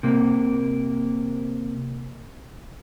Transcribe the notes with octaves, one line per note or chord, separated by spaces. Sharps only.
C3 A#3